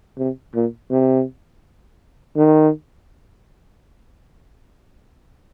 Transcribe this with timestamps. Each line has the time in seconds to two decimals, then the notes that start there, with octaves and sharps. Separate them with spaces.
0.18 C3
0.55 A#2
0.90 C3
2.36 D#3